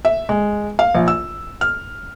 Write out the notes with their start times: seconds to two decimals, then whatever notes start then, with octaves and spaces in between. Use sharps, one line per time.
0.05 E5
0.29 G#3
0.79 F5
0.95 A#1
1.08 E6
1.61 F6